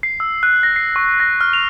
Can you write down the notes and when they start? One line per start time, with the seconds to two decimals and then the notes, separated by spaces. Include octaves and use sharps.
0.03 C7
0.20 E6
0.43 F#6
0.63 A#6
0.76 C7
0.96 C#6
1.20 A#6
1.41 F6
1.53 F7